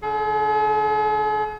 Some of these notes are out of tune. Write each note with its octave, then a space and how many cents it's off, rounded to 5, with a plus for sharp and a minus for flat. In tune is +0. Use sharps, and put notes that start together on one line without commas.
D3 +0 G#4 +45